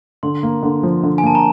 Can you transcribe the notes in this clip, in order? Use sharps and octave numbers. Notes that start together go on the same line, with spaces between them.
D3 C6
A#3
D3
F3
D3
G#5
A#3 A5
A#5